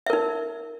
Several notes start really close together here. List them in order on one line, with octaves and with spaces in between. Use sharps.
E5 A#4 D#4